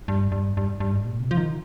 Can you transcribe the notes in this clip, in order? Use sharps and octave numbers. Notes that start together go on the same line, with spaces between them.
G2
G2
G2
G2
G#2
A#2
C3
F3
D#3